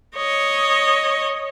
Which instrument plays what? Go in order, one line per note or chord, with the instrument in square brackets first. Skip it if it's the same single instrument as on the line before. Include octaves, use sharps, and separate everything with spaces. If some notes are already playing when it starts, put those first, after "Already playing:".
[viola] C#5 D#5